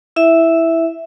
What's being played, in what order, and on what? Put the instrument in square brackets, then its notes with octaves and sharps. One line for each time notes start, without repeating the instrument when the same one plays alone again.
[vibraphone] E4 E5